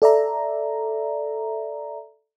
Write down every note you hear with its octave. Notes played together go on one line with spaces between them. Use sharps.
A4 D5 E5 A#5